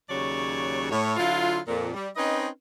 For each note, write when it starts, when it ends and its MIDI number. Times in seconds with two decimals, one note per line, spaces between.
0.10 0.91 39
0.10 0.91 49
0.10 0.91 54
0.10 0.91 66
0.10 0.91 73
0.10 0.91 74
0.91 1.15 45
0.91 1.15 73
1.17 1.58 50
1.17 1.58 54
1.17 1.58 64
1.17 1.58 65
1.68 1.91 41
1.68 1.91 46
1.94 2.08 55
2.16 2.47 60
2.16 2.47 61
2.16 2.47 63
2.16 2.47 71
2.16 2.47 75